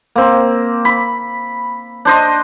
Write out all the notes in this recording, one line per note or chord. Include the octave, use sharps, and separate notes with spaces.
A#3 C4
B5
D4 C5 D#5